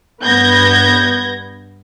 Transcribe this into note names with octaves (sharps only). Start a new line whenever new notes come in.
G2 B3 G6 G#6 A#6